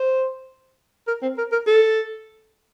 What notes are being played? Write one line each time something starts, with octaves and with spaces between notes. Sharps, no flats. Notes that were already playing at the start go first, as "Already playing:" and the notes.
Already playing: C5
A#4
C4
A#4
A#4
A4